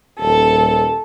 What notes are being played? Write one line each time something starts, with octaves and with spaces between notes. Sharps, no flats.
D#1 A4